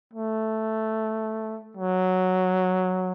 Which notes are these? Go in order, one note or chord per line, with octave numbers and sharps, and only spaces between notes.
A3
F#3